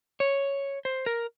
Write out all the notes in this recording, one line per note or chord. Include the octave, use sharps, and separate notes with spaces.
C#5
C5
A#4